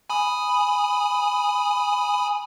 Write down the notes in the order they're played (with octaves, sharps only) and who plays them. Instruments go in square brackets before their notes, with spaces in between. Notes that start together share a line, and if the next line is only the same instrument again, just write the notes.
[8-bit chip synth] G#5 B5 D#6